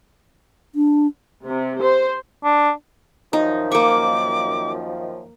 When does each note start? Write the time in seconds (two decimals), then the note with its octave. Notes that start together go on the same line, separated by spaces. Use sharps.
0.75 D4
1.46 C3
1.83 C5
2.44 D4
3.33 F#2 D#3 F3 D#4
3.72 A#3 C#6 D6